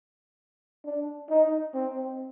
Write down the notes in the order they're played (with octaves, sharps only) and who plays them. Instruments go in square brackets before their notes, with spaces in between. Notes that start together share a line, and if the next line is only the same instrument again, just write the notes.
[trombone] D4
D#4
C4